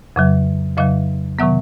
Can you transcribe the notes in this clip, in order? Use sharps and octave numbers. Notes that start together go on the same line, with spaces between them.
F2 C#3 F#3
F2 C#3 F#3 D#5 F5
C3 D#3 F#3 B3 E5 F#5